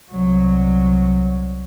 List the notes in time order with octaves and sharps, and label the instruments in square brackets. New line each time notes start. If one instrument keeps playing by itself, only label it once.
[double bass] C2 F#3